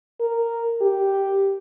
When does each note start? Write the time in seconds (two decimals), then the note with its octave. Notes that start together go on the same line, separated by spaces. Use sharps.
0.20 A#4
0.81 G4